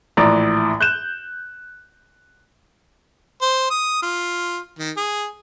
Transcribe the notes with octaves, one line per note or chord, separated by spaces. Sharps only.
A#1 A2 E3 D5 A#5
F#6 G6 E7
C5
D#6
F4
D#3
G#4